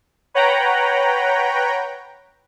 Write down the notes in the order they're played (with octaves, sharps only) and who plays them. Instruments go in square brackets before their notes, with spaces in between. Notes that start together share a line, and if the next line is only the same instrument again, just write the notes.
[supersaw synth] B4 C#5 F#5 G5 A#5 B5